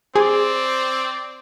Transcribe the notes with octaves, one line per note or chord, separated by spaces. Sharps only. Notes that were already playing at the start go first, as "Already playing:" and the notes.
C4 G#4 C5 D5